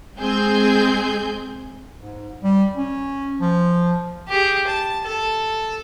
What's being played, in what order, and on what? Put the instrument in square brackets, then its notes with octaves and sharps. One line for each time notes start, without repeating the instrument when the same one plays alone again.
[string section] G#3 C4 G#4 G6
[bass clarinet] G#2
G3
C#4
F3
[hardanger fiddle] G4 G#4
A5
A4